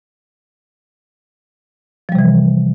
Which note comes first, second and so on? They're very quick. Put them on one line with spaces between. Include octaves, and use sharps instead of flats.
F3 G3 C3 E3